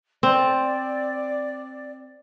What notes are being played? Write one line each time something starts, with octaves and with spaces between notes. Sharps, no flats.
C4 D5